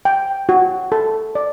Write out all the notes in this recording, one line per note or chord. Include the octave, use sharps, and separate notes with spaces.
G5
F#4
A4
D5